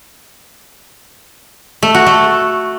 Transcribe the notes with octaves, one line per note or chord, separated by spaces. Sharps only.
A3
F#4
A3